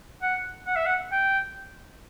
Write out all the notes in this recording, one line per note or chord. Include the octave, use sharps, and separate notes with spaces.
F#5
F#5
E5
F#5
G5